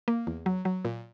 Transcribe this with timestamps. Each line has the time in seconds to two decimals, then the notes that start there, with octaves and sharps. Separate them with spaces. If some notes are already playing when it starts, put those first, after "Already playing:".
0.08 A#3
0.27 E2
0.46 F#3
0.65 F#3
0.85 A#2